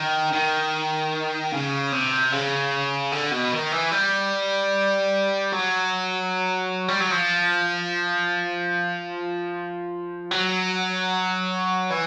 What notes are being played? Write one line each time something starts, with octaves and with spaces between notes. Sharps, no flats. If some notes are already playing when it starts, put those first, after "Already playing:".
Already playing: D#3
D#3
C#3
C3
C#3
D3
B2
D#3
E3
G3
F#3
G3
F#3
F3
F#3
E3